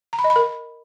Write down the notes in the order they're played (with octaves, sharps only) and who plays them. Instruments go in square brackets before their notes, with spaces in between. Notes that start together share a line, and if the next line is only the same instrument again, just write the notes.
[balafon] A#5
B5
D#5
B5
A#4